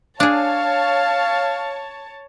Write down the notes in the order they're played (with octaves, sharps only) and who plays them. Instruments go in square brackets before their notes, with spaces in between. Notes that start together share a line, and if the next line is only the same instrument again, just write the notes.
[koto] D4 G#4 [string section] C#5 A5 [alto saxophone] F5